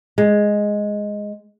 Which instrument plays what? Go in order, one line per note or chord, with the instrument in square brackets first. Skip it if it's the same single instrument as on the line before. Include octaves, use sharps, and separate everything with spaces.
[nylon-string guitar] G#3